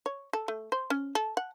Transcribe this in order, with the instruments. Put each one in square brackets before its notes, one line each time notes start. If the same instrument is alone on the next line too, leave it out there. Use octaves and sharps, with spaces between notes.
[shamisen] C#5
A4
A3
C5
C#4
A4
F#5